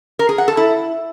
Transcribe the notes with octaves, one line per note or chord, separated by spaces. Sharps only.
A#4
G#4
F#5
A4
E4